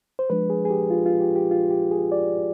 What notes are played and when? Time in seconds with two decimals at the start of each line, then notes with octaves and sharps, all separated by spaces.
0.19 C5
0.30 F3 G#3 D4 B4
0.50 G#4
0.65 G#4
0.70 G4
0.90 F4
1.06 F4
1.20 G4
1.36 G4
1.51 F4
1.71 G4
1.91 G#4
2.12 D5